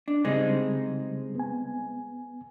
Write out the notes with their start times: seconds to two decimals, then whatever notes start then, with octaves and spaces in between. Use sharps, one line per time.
0.08 D4
0.25 C#3 G3 G#3 C4 D#4
1.35 B3 G#5